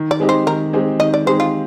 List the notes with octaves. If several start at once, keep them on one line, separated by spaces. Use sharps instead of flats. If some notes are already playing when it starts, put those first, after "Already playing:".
Already playing: D#3
D5
G#3 C4 D#4 G4
C5
D#3 A#4
G#3 C4 D#4 G4
D#3 D#5
D5
G#3 C4 D#4 G4 C5
F4